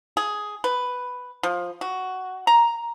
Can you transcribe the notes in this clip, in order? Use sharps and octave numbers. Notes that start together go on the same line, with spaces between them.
G#4
B4
F3
F#4
A#5